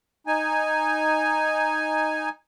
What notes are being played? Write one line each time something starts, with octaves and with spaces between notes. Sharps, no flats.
D#4 G#5